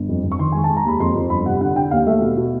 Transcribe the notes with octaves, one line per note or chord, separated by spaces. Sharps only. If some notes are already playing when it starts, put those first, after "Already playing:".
Already playing: G1
F2
F2
C#6
D#3 C6
G#3 G#5
A5
G#3
A#5
D#2 B5
F2 C6
F2
G1 B5
C3 F#5
D3 F#5
D3 G5
D#2 F5
A3 E5
B2
B2